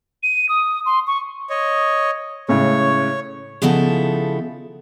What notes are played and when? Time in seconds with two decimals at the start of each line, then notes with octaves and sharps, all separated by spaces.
0.23 D#7
0.49 D#6
0.86 C6
1.07 C#6
1.50 C#5 D#5
2.48 A2 C#3 G#3 C#5
3.62 C#3 F3 B3 D#4 E4 A4